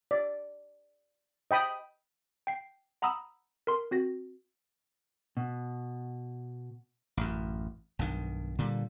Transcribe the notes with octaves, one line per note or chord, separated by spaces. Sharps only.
D5
D#5 G5 B5 D#6
G5 C7
F#5 A#5 B5 D#6 E6
A#4 C6
C4 F#4 A#6
B2
A1 F#2
B1 G2 D#3
A#2 D3 G3